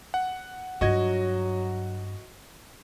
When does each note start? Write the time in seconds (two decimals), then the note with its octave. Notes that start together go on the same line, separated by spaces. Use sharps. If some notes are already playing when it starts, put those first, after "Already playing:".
0.14 F#5
0.81 G2 F#3 F4 F#4 D#5 G#6